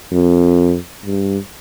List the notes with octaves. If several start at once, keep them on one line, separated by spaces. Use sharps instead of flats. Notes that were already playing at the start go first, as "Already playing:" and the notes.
F2
G2